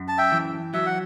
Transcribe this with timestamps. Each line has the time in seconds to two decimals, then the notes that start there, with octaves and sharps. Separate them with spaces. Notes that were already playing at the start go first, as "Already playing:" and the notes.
Already playing: F#2
0.08 A5
0.18 E5 G5
0.32 E3
0.74 F#3 E5
0.86 F#5